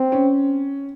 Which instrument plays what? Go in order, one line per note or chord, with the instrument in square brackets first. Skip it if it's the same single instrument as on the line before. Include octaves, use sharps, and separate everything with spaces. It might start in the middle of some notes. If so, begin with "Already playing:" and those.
Already playing: [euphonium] C4
[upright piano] C#4